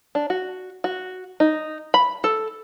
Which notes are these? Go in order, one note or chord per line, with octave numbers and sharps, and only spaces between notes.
D4
F#4
F#4
D#4
B5
A4